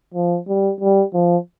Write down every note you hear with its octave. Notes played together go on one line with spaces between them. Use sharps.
F3
G3
G3
F3